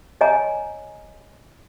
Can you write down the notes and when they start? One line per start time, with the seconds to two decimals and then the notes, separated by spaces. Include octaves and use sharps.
0.21 C#5 D#5 G#5 A#5